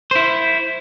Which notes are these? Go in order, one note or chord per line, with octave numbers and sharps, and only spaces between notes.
E4 C5